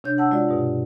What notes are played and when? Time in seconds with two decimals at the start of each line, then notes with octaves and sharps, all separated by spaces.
0.04 C3 D4 C#5 G6
0.18 F#5 A5 E6
0.32 G#3 F4 F#4 D5
0.48 G2 B2